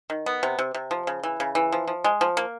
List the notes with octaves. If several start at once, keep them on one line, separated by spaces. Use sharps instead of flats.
D#3
B3
C3
C3
C3
F3
C#3
E3
C#3
E3
F3
F3
G#3
F3
A#3